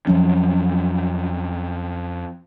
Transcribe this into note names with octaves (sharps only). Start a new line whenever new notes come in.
F2 F3 F#3 C#4